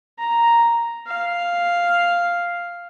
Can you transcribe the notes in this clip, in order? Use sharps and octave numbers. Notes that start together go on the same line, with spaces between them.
A#5
F5